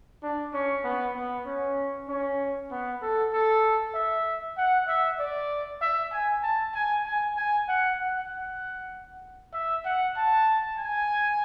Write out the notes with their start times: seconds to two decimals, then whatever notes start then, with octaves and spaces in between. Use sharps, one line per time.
0.23 D4
0.54 C#4
0.84 B3
1.16 B3
1.46 C#4
2.09 C#4
2.71 B3
3.02 A4
3.33 A4
3.95 E5
4.57 F#5
4.88 E5
5.19 D5
5.81 E5
6.13 G#5
6.43 A5
6.74 G#5
7.06 G#5
7.37 G#5
7.68 F#5
7.99 F#5
9.54 E5
9.85 F#5
10.16 A5
10.78 G#5